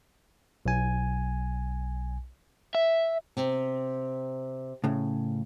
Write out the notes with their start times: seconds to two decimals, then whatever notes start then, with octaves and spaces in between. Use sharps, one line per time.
0.66 B1 G#5
2.75 E5
3.37 C3
4.84 A2 C#3